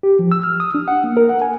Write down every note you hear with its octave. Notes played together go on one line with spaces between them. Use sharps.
G4
F3
E6
F6
D#6
D4
F#5
A#3
A#4
F#5
G#5